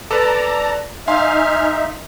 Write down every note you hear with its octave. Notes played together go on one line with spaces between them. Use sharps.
A4 B4 D5 A5 A#5
D#4 E5 F5 G#5 C6 F6